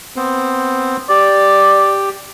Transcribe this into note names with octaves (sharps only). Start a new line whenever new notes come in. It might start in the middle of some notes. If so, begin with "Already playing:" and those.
B3 C4 C5
G4 D5